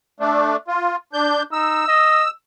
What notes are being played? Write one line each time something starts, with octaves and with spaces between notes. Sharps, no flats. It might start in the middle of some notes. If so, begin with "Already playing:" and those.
A3 D4
F4
D4 G6
D#4 E6
D#5